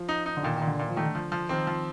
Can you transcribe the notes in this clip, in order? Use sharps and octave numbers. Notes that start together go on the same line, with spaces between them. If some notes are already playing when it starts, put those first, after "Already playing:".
Already playing: F3
D#4
D#4
D3
A#2 D#3
D#3
A#2
D3
A#2 D#3
F3
D#3 A3
D3
F3
F3
D#3 C4
F3